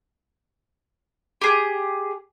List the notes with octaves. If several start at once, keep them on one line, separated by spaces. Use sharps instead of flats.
G4 G#4